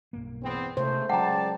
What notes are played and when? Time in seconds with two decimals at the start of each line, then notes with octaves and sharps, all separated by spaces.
0.13 B1 G2 A#3
0.43 E2 B3 C4
0.77 C#2 C3 A3 C5
1.09 C#2 F#3 G#3 D5 F#5 G5 A5 A#5